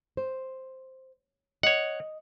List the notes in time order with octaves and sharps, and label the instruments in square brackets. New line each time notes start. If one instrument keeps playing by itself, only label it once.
[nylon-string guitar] C5
[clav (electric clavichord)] C#5 F#5 [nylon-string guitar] D#5